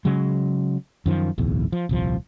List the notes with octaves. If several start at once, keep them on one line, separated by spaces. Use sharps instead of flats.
C#3 F#3 G#3
F#2 D#3 F3
D1 B1 E2
F3
D#1 C2 F3